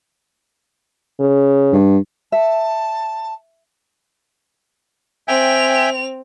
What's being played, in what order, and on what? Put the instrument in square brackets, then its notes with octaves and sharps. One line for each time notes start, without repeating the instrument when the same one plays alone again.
[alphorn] C#3
[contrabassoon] G2
[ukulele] E5 [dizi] A5
[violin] C4 F7 [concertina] E5 G5 G#5